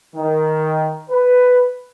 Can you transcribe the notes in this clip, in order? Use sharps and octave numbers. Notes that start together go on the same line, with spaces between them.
D#3
B4